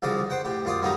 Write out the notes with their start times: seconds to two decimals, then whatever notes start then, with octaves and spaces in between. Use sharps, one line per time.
0.02 C2 C#3 F3 F#4 D5
0.30 C5 F#5 G5
0.45 A2 G4
0.65 F#2 F4 D5 D#6
0.82 A2 F#3 G3 A#3 D#4